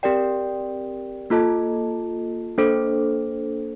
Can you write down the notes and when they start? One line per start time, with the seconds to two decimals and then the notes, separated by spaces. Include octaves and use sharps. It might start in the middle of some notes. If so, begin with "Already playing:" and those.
0.03 C4 G4 A#4 D5 G5
1.30 A#3 F4 A4 D#5 A5
2.58 A#3 D4 A4 C5